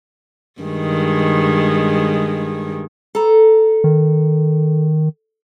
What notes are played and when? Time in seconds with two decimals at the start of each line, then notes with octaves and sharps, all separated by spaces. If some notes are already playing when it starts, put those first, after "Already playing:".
0.61 G2 D#3 G#3
3.15 A4 A#5
3.84 D#3